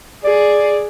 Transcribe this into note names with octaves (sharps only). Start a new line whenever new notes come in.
G#4 D5